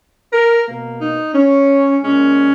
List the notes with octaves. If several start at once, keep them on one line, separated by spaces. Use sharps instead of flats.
A#4
B2 A#3
D#4
C#4
A#2 G#3 C#4